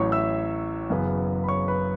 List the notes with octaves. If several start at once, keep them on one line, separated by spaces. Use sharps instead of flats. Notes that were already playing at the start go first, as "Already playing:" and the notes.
Already playing: A1 A2 F#3 C#5 C#6
E5 E6
F#1 F#2 C#3 E3 B3
B5
C#5 C#6
B4 B5